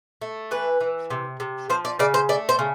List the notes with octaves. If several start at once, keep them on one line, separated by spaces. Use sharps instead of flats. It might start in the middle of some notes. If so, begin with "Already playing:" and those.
A3
E3 B4
E3
C3
C3
F3 C5
D5
C#3 D5
C5
A3 D5
C5
C#3